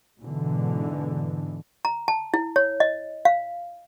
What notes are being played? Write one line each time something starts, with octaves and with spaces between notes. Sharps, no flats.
G#2 B2 D3 E3
A#5
A5
E4
C#5
D#5
F5